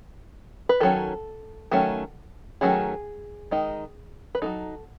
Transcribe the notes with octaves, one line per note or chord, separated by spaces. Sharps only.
B4
D#3 F#3 C#4 A4
D#3 F#3 A3 C#4
D#3 F#3 A3 C#4 G#4
D#3 G#3 D#4
B4
F#3 A3 D#4 A4